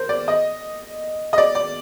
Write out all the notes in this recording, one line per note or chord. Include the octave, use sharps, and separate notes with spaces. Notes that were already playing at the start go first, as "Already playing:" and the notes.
Already playing: A#4 C5
D5
D#5
D#5
D5
D5